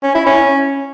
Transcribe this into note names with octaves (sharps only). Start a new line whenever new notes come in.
C#4
E4
C#4